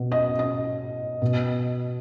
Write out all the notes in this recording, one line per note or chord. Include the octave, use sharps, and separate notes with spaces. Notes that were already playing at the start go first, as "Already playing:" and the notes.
Already playing: B2
D#5
D#5
B2